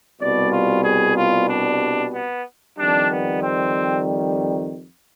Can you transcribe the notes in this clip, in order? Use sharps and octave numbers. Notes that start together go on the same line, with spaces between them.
C2 B2 G3 D5
F4
G#4
F4
D4
B3
F2 D#3 G3 D4
B3
C4